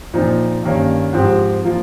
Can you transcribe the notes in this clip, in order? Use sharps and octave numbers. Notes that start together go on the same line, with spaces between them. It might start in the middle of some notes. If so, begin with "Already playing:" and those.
A#2 F3 C4 D#4
G2 D#3 A#3 C#4
G#2 F3 C4 G4
F3 A#3 F4